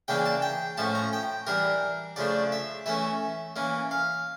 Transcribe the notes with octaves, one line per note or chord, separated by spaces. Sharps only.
C#3 E3 A#3 D4 G5
A5
G5
A2 F3 A3 C#4 A5
A#5
G5
E3 G3 D4 A#4
C#3 F3 A3 D4 D5
E5
E3 A3 C#4 E5
E3 A#3 C#4
F5